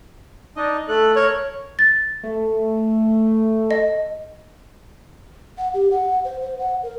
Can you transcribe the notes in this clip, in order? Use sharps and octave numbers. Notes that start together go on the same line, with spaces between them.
D4 D#4 D#5
A3 A4 F#6
A#4 C#5 C#6
A6
A3
D#5
F#5
G4
F#5
C5
C5
F#5
A#4